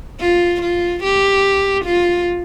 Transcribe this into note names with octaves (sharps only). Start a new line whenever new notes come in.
F4
F4
G4
F4